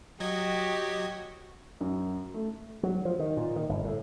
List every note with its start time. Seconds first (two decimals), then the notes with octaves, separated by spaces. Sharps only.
0.20 F#3 F#4 G4 D#5 G#6
1.81 F#2
2.34 A3
2.83 F#3
3.05 F3
3.19 D#3
3.37 A#2
3.56 D#3
3.69 G1
3.84 A2